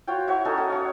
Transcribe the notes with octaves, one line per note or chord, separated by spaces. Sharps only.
F4 F#4 C#5 G5
E4 F#4 C#5
C#4 D#4 A4 A#4
F#4 D#5 F#5
D#4 C#5 F5